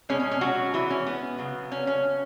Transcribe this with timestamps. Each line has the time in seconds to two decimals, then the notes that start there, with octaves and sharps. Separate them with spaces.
0.09 B2 G#3 C#4
0.20 C#4
0.31 C#4
0.41 F#3 F#4
0.74 E3 E4
0.90 C#4
1.06 B3
1.38 C#3 F#3
1.72 C#4
1.87 C#4